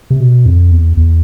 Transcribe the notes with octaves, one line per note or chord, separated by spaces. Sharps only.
C3
B2
F2
E2
E2